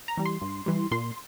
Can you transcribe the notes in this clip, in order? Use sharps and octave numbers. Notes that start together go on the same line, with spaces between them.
A#5
E3 G3
C6
G2
E3 G3
A#2 C6